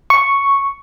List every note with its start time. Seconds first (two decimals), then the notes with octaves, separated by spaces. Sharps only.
0.10 C#6